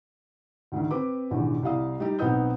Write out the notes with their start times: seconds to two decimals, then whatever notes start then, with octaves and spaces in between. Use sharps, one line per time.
0.72 D2 G#2 D3 D#3
0.91 C4 B4 D6
1.31 A1 E2 B2 D3 D#3
1.63 C2 E4 F5 D#6
2.00 G3 D#4 G4
2.19 B1 B3 C4 D#4 D#6 G6